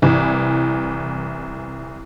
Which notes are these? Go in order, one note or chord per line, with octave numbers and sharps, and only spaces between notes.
C2 E3